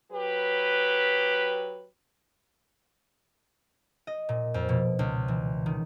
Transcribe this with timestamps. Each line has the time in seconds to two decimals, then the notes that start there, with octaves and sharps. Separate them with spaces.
0.11 F#3 G4 B4
4.07 D#5
4.29 A#2
4.54 F2
4.69 B2
4.99 C#2
5.28 E3
5.66 D#3